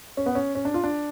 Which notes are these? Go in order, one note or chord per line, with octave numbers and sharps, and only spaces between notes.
C#4
B3
C#4
C#4
D4
F4
D4